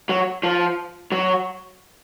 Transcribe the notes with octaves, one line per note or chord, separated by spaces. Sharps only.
F#3
F3
F#3